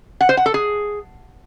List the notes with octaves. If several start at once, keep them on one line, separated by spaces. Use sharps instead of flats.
F#5
C5
F#5
A4
G#4